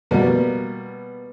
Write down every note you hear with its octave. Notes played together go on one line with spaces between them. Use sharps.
B2 G3 A#3 B3